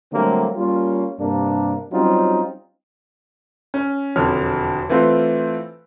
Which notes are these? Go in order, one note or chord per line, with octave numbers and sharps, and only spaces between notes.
D3 F#3 G3 A3 A#3 C4
G3 A#3 C#4 F4
G2 C3 A#3 D4
F#3 G3 C4 C#4 D#4 F4
C#4
E1 F2 D3 C#5 F6
E3 A3 C4 F4 B4